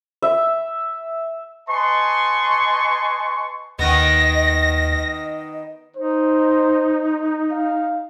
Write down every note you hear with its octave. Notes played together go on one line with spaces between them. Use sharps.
E5
B4 D#5 G#5 A5 C6 C#6
D#2 D#3 B3 D#5 A#6
D#4 C5
F5